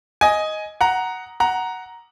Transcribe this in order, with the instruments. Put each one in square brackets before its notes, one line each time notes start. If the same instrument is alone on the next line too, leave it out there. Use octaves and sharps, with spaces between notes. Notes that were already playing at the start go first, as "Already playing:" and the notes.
[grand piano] D#5 G#5
F#5 A#5
F#5 A#5